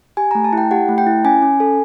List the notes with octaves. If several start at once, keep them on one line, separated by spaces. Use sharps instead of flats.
G4 G#5
A3 A#5
A5
E4 G5
G4 F#5
A3
G5
E4
C#4 G#5
C#4
A4